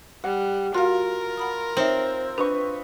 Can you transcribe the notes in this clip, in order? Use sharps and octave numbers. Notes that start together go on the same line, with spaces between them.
G3 F#5
F4 F#4 A#4 F5
F#5 B5 D#6
C4 D#4 C#5 E5
D4 B4 D#5 C#6